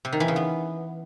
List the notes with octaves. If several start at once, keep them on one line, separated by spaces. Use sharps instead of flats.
C3
D#3
E3
C#3
B3